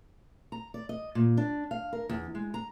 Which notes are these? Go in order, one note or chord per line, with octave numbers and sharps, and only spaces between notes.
A#5
D5
D#5
A#2
D4
F5
A#4
E2
G#3
A#5